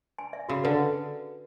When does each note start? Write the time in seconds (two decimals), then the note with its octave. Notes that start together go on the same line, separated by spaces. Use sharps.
0.19 G#5
0.33 E5
0.49 C#3 F#4
0.64 D3 B4